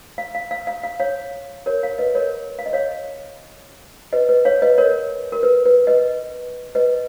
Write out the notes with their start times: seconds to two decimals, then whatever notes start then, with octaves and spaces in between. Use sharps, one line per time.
0.18 F5
0.35 F5
0.51 F5
0.67 F5
0.83 F5
1.00 C#5 F5
1.66 A#4 C#5
1.83 C#5 F5
1.98 B4 D#5
2.15 A#4 C#5
2.59 F5
2.66 D#5
2.73 C#5 F5
4.13 B4 D#5
4.29 B4
4.45 C#5 F5
4.62 B4 D#5
4.78 A#4 C#5
5.32 A#4
5.43 B4
5.66 B4
5.87 B4 D#5
6.75 B4 D#5